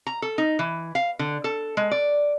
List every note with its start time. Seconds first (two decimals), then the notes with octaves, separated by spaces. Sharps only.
0.07 A#5
0.22 A4
0.38 D#4
0.59 E3
0.95 F5
1.19 D3
1.44 A4
1.77 G#3
1.91 D5